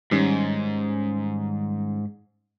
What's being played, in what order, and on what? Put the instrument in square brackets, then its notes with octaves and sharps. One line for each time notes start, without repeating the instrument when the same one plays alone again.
[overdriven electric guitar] G#2 [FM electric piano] D#3 G3 C#4